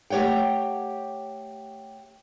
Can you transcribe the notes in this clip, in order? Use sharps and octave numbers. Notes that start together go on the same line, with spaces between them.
A3 G4 C#5 F#5 G5